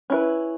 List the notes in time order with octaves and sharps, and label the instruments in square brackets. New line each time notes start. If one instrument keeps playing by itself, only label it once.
[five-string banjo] C#4 E4 B4